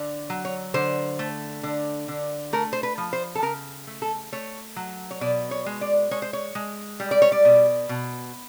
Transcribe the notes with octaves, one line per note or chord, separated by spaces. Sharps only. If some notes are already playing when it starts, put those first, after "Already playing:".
Already playing: D3
F#3
C#5
D3 C5
A3
D3
D3
A3 A#4
C5
B4
F3
C5
A4
C#3 A#4
A3
A4
A3 C#5
F#3
C#5
B2 D5
C#5
G#3
D5
G#3 C#5
C5
C#5
G#3
G3
D5
C#5
D5
B2
B2